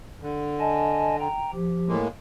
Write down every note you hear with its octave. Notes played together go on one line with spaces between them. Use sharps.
D3
D#5 G#5 A5
G5 A#5
F3 G4
A2 G#3 A#3